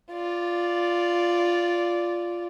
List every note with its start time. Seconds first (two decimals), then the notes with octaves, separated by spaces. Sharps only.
0.12 F4 D5